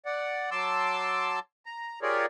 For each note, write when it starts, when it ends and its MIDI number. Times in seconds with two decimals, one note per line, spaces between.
0.06 0.50 74
0.06 0.50 78
0.51 1.39 54
0.51 1.39 81
0.51 1.39 84
0.51 1.39 86
0.51 1.39 88
1.66 2.00 82
2.02 2.26 65
2.02 2.26 67
2.02 2.26 68
2.02 2.26 70
2.02 2.26 73
2.02 2.26 74